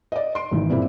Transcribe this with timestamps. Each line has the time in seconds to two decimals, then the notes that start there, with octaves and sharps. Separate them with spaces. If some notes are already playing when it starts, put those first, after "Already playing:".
0.12 D5 D#5
0.35 C6 D7
0.51 G#1 D#3 E3
0.70 G2 A#2 C#3 A#3 C4 E4